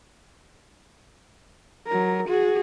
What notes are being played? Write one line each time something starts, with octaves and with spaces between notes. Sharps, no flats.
F#3 A#4
F#4 G#4